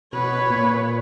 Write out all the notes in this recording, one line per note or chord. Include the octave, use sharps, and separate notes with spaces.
B2 B4 C#5
A#2